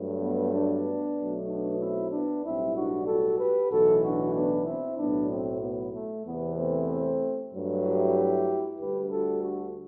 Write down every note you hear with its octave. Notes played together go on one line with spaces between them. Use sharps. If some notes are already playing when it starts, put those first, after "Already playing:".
Already playing: G2 F#3 A3
B3
B3 D4
B1 B2 F#3 A3
B3 D4
C4 E4
B3 D4
B1 A2 G3 C4 E4
D4 F#4
F#4 A4
G4 B4
B1 A2 E3 F#4 A4
D4 F#4
B3 D4
C4 E4
B1 A2 F#3 B3 D4
A3 C4
B3
A3
E2 C3 E3 B3
A3 C4
G2 F#3 A3
E4 G4
D2 D3 G3 G4 B4
F#4 A4
D4 F#4